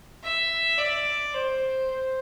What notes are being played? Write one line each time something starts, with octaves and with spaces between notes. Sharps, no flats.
E5
D5
C5
C5